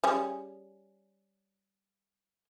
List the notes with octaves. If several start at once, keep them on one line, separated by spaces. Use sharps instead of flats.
G3 C#4 G#4